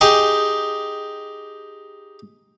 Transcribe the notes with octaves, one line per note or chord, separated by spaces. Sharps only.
D#4 G4 G#4